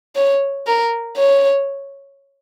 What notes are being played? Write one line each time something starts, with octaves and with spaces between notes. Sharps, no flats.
C#5
A#4
C#5